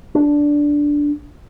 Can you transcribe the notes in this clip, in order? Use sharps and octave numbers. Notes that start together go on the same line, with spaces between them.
D4